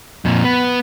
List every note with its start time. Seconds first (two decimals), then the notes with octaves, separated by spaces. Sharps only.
0.25 F2 A#2
0.44 B3